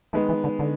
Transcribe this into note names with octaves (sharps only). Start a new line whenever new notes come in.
D#3 G#3 A3 B3
E3
D3
D3